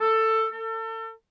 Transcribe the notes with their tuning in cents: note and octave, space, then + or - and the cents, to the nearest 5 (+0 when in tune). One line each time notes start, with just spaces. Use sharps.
A4 +15
A4 +35